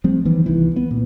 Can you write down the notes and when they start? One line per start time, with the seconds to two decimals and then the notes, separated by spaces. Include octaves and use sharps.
0.04 F3 G3 A3 C4
0.25 F#1 D#3 E3 B3
0.46 C2 D#3 E3
0.76 B3
0.91 A#2